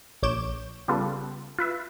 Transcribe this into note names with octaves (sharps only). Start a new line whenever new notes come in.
A#1 C#5 D6 G6 E7
C#3 G3 B3 F4 A4 B4
F4 B4 E5